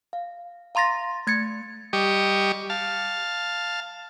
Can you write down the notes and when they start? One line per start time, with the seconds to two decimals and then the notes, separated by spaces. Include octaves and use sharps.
0.13 F5
0.75 F5 A#5 C6 A6 A#6
1.27 A3 G#6 A6 C#7
1.93 G3 G4 D#5 C#6
2.70 F5 A5